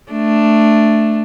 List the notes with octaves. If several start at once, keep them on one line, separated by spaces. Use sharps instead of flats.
A3 D4